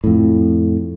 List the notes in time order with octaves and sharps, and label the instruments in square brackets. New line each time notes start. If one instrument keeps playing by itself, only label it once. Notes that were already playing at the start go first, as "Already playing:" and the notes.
[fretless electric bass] F2 A2